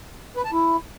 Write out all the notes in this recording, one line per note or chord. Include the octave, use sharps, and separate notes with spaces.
B4
A5
E4